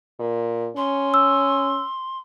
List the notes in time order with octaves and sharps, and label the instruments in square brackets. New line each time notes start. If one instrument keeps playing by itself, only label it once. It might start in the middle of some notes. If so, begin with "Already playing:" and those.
[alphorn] A#2
[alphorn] C#4 [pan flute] C6
[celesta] E6